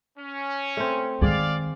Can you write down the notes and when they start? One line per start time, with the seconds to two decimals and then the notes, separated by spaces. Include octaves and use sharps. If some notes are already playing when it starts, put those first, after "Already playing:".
0.18 C#4
0.77 A3 C4
1.22 D#3 G#3 G#4 D5 F5